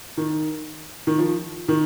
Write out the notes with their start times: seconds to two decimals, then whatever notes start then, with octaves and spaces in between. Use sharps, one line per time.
0.17 D#3
1.07 D#3
1.18 F3
1.68 D#3